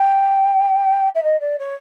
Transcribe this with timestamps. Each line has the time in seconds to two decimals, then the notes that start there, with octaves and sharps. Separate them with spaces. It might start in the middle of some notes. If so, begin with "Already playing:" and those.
Already playing: G5
1.15 E5
1.23 D#5
1.40 D5
1.59 C#5